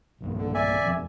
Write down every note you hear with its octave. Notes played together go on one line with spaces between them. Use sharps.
B1 G2 A#2
D3
D5 E5 G#5
E1 F2